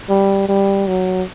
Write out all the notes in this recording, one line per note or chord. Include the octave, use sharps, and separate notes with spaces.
G3
G3
F#3